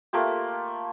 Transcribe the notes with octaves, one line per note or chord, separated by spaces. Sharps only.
A3 A#3 F4 G4